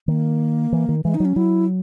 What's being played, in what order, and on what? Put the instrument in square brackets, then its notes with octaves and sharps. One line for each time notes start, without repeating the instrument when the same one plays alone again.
[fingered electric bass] D#3 [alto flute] A#3
[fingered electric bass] E3
D#3
[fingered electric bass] E3 [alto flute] G#3
[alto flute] D#4
[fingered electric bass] F#3
[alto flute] C#4
[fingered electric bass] F#3 [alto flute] E4